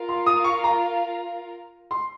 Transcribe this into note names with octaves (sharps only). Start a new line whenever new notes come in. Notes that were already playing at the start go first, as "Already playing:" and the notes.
Already playing: F4 A#4 F5
C6
D#6
C#6
A#5
C6